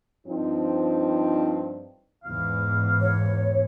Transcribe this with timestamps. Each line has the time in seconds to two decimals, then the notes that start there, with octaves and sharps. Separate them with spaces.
0.26 G2 F3 C4 D#4
2.24 E2 G#2 F5
3.01 C#5